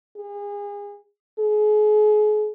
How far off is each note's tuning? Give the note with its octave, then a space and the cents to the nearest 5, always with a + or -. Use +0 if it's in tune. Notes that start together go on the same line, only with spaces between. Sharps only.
G#4 -35
G#4 +35